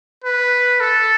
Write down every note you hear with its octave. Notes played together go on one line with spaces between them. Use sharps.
B4
A4